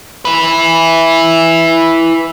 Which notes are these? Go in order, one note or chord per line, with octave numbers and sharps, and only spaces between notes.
E4 B4